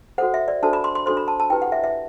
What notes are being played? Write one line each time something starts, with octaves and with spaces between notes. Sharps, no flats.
F#4 A4 C5 F#5
E5
D5
D4 F#4 A4 C5 A5
B5
C6
C6
D4 F#4 A4 C5 C6
B5
A5
A5
E4 G4 B4 G5
F#5
E5
E5